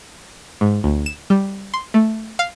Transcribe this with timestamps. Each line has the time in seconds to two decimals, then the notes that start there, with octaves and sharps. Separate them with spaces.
0.61 G#2
0.84 D2
1.06 E7
1.30 G3
1.74 C6
1.94 A3
2.39 F5